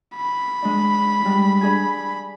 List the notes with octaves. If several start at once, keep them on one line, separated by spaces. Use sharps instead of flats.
B5
G#3 D4
G3 G#3
D4 G#4 G#5